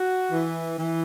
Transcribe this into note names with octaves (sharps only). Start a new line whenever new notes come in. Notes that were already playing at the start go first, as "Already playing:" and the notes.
Already playing: F#4
E3
E3